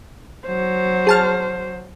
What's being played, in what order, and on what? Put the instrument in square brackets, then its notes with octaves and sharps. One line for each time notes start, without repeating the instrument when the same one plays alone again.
[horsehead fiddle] F#3 C5
[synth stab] G#4 A5 F6